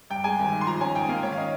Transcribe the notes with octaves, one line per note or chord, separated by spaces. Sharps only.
G2 G5
G#3 G#5
G#1
D#3
C6
F3 A#5
C#4 G#5
G#2 G5
A#3 F5
D#3 C#5
F5
C#4 D#5